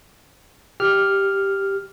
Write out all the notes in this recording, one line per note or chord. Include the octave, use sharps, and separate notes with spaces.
G4 F6